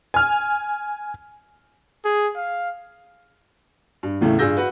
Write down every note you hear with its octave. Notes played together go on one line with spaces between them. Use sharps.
G#5 F6
G#4
F5
G2
E2 A2 C#3 A3 E4
G2 F4 G#4 E6 G6 A#6
F#4 B4 F#5